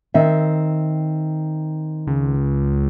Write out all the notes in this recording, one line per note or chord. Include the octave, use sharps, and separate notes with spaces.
D#3 C4 E5
C#2